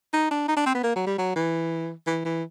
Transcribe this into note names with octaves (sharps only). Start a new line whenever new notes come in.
D#4
D4
D#4
D4
C4
B3
A#3
F#3
G3
F#3
E3
E3
E3